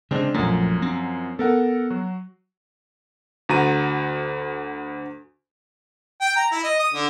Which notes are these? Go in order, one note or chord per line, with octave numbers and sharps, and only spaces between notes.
C#3 G#3 C4 D4
A#1 F#2 F3 F#3 A3
C4
B3 A4 A#4 F#5
F#3 F#4
D2 F#4 A#5 D#7
G5
A#5
E4
D#5
D#6
D3